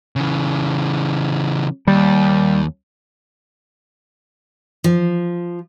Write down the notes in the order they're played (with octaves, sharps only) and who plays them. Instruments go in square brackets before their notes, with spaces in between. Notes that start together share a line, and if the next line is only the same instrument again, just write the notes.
[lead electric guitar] C#3 E3
[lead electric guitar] D#2 [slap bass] G3
[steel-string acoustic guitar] F3